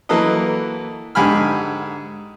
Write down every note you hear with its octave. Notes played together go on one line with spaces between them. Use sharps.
E3 F#3 A#3 A4 B4 D#5
G#2 D3 G4 G#5 B5 F6